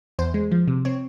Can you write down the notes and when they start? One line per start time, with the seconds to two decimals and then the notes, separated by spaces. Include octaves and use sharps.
0.19 E2 C5
0.34 G#3
0.52 F3
0.68 C3
0.85 C4 C#5